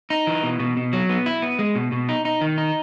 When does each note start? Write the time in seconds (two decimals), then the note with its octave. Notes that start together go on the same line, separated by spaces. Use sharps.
0.10 D#4
0.27 E3
0.43 B2
0.59 B2
0.77 B2
0.93 F#3
1.09 B3
1.26 E4
1.42 B3
1.59 G#3
1.75 B2
1.92 B2
2.09 D#4
2.25 D#4
2.41 D#3
2.58 D#4